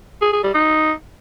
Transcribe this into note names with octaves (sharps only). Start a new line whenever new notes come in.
G#4
G#4
G3
D#4